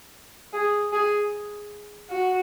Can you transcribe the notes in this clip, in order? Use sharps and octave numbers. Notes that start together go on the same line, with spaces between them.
G#4
G#4
F#4